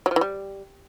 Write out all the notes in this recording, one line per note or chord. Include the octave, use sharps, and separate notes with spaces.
F#3
F3
E3
G3